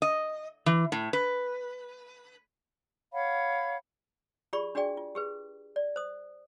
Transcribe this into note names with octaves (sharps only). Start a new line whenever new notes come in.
D#5
E3
A2
B4
C#5 F5 F#5 B5
F4 G4 G#4 D5 B5 C#6
D4 F#4 G#4 D5 G5
F4
G4 G#4 B4
D5
C5 D#6